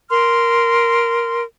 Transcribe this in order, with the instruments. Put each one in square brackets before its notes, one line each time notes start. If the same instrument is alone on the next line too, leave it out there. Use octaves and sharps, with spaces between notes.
[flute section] A#4 C6 F6